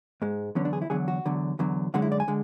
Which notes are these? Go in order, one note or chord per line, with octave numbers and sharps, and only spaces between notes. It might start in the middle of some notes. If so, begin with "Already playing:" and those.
G#2 G#3
E2 D3 F#3 C#4
D4
G#4
E4
E2 D3 F#3 G#4
F#4
E2 D3 F#3
E2 D3 F#3
F#2 D3 G#3 F#4
E4
D5
G#5
D3 G#3